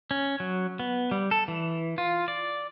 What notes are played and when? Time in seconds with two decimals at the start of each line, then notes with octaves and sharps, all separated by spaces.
0.11 C#4
0.40 F#3
0.80 B3
1.11 G3
1.31 A4
1.48 E3
1.98 F4
2.28 D5